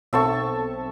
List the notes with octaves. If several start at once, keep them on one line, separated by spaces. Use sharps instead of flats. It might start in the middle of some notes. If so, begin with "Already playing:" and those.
B1 C4 A4 E5 A5 C#6